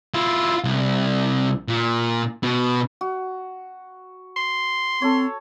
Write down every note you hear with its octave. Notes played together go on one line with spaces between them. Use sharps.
E4 F4
C2
A#2
B2
F#4
C6
C4 A4 C#5